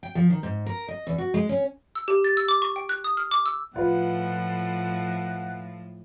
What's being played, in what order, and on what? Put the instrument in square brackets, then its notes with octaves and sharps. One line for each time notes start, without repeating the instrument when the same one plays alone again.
[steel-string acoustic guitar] G5
F3
D#3
G#2
A#4
D#5
E2
F#4
G#3
C#4
[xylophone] E6
G4
A6
E6
D6
C#6
G5
F#6
D#6
F6
D6
E6
[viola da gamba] A2 F3 [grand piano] F4 B4 [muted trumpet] F#5